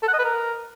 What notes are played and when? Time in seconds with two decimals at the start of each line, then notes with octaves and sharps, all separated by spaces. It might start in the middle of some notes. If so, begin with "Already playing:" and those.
0.03 A4
0.08 F#5
0.13 D#5
0.19 B4
0.24 A#4